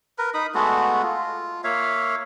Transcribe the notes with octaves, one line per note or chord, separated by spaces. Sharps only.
A#4 B4
D#4 B5 D#6
G#3 A3 B3 F#4
F4
A#3 C#5 E5 F5